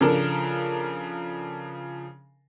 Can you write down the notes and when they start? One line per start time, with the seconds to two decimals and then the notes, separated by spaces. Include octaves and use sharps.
0.01 C#3 F3 D4 A4 A#4